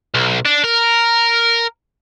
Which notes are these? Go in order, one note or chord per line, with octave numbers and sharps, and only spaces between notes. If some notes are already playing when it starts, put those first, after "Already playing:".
B1
D4
A#4